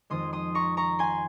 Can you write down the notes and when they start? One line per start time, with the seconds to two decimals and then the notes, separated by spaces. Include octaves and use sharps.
0.10 F2 D#3 G#3 C6 D#6
0.33 C6 D#6
0.55 A#5 C#6
0.77 A#5 C#6
0.99 G#5 C6